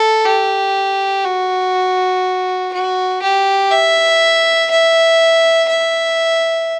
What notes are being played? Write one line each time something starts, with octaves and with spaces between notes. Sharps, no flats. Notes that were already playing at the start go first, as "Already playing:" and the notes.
Already playing: A4
G4
F#4
F#4
G4
E5
E5
E5